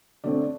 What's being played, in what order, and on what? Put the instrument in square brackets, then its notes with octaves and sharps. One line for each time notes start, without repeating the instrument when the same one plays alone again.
[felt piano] D3 A3 C4 D5